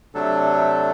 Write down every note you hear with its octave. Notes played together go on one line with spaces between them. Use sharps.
C3 F#3 A3 D4 A4